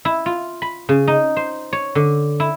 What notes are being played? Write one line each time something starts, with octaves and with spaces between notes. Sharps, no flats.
E4
F4
B5
C#3
D#4
C5
C#5
D3
E4